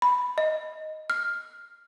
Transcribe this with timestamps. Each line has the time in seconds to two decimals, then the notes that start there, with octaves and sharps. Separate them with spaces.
0.02 B5
0.38 D#5
1.10 F6